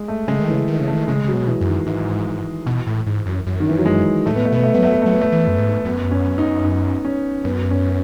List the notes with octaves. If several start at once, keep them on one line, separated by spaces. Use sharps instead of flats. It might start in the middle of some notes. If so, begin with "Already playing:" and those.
Already playing: G#3
A3
C#3 G#3
D#3
E3
C#3
D#3
C#3
A3
D#3
C#3 G#3
C#3 F#3
B2
E3
F#2
D#3
G#2 E3
B2
A2
G#2
F#2
F#2
D#3
E3
F#3
G#3
A2 A3
B3
A3
B2 B3
A3
G#3 B3
F#3 A3
B3
F#3 A3
B3
A3
E3
F#2
G#2
F#2 B3
C#4
D#4
D#4
C#4
F#2 B3
C#4